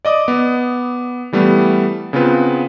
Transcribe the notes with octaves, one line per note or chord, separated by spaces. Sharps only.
D5 D#5 D6 D#6
B3
E3 G3 A3 B3
C#3 B3 C4 F4 B4